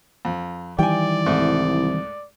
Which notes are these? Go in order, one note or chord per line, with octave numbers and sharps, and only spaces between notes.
F2
D#3 E3 G3 D5 G5 G#5
C2 G#2 A3